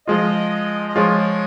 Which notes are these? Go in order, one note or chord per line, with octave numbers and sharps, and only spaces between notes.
F3 G#3 F4 D#5
D#5
F3 G#3 F4 C#5